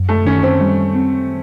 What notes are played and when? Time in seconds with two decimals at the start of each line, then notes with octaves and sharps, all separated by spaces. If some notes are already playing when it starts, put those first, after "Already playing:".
Already playing: F#2
0.09 A3
0.26 D#3 C#4
0.43 C4
0.61 G3
0.95 C4